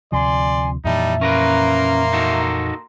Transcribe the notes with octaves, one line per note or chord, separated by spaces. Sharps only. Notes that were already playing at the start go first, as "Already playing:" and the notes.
D2 C3 F3 D5 G#5 C6
F2 A#2 E3 G3 D#4 E5 A5
A#3 C#4 A#4 B4 A#5 C6
D#4 F#4 A4